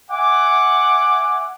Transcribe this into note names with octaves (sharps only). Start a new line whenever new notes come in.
E5 F#5 G#5 D6